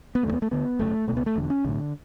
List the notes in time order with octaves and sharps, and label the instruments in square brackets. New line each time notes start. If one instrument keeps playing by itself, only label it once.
[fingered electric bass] B3
F#1 E2 D3 A3
B3
A3
D2 D3 B3
G1 F#2 C#3 A3
B2 A3
C#2 B3
A3
E1 E2 D3
C#4
B1 A2 D3